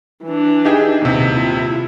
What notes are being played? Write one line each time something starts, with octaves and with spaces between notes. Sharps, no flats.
E3 D4
D#4 G4 G#4
D#1 C3
E4 F4